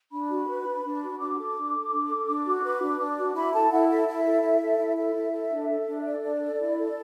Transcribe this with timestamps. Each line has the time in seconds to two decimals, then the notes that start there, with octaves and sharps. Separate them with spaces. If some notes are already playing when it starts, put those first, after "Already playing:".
0.11 D4 B5
0.30 F#4
0.47 B4
0.65 D4
0.84 D4
1.02 F#4
1.19 D4 D6
1.38 A4
1.55 D4
1.74 A4
1.92 D4
2.10 A4
2.27 D4
2.45 F#4
2.63 B4
2.81 D4
2.99 D4
3.18 F#4
3.35 E4 B5
3.52 A4 A5
3.71 E4 F#5
3.89 A4 E5
4.07 E4
4.25 A4
4.43 E4
4.61 A4
4.79 E4
4.96 A4 E5
5.15 E4
5.33 A4
5.51 D4
5.69 A4
5.87 D4
6.05 A4 D5
6.23 D4
6.40 A4
6.59 E4
6.77 A4